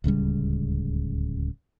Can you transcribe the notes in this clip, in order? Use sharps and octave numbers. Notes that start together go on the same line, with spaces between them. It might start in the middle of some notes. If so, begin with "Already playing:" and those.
D1 C#2 C#3 G3